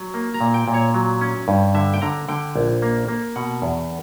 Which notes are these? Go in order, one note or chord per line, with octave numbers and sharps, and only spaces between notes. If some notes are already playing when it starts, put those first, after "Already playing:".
Already playing: F#3
A#3
A#5
A#2
G5
A#2
C#5
F#3
C#4
G2
D3 E5
G5
D3 A#5
D3 G5
A#1
A#3
A#3
B2 F#5
E2